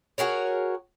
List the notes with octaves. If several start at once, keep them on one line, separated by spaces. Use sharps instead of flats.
F#4 G#4 A#4 C#5